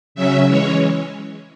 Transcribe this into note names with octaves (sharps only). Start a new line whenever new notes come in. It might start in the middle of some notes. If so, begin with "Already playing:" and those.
C#3 F#3 C#4 E5
E3 G#3 C#4 C#5